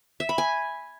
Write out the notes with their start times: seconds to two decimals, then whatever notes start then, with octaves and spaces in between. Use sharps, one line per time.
0.20 E5
0.29 B5
0.38 G#5